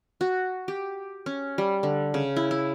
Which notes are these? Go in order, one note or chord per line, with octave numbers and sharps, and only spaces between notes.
F#4
G4
C#4
G3
D3
C#3
E4
E4